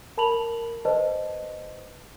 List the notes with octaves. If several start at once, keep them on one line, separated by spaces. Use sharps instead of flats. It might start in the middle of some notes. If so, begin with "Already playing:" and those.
A#4 A5 B5 F7 F#7
B4 C5 D#5 A5